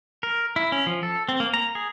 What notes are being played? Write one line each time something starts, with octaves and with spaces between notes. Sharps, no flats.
A#4
E4
C#4
F3
A4
C4
A#3
A#5
G#4